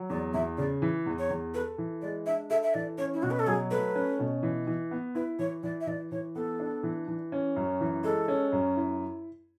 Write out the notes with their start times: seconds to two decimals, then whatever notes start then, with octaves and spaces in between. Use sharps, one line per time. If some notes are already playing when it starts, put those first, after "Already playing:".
Already playing: F#3
0.10 E2 D5
0.34 E2 E5
0.58 C#3 D5
0.82 E3
1.06 E2
1.19 C#5
1.30 E2
1.54 A4 B4
1.78 E3
2.02 G#3 D5
2.26 D4 E5
2.50 A4 E5
2.63 E5
2.74 E3 D5
2.98 C#4 C#5
3.14 E4
3.23 B2 F#4
3.31 B4
3.39 A4
3.47 F#3 G#4
3.71 A3 B4
3.95 C#4
4.19 B2
4.43 E3
4.67 E3
4.91 B3
5.15 E4 B4
5.39 E3 C#5
5.63 E3 D5
5.81 E5
5.87 E3 D5
6.12 E3 C#5
6.36 B3 A4
6.60 D4
6.83 E3
7.08 E3
7.32 C#4
7.56 F#2
7.81 E3
8.04 G#3 A4
8.28 C#4
8.52 F#2
8.76 E4